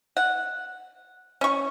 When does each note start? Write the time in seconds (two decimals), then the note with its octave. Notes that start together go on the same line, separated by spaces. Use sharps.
0.17 F#5
1.41 C#4 C#6